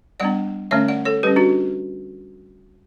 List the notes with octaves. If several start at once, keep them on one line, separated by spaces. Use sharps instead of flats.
G3 B3 D4 D5 F#5
D3 A3 C#4 C#5 E5
D5 F#5
A4 C#5
G3 C#4 G4 B4
D4 F#4